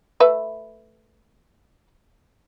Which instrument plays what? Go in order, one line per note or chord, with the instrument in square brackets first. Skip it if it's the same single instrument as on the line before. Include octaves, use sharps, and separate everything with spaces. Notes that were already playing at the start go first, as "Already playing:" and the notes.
[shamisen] A3 B4 E5